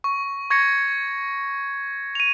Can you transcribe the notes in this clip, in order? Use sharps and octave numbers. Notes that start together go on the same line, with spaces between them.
C#6
C#6 G#6 A#6 C#7
D#7 F7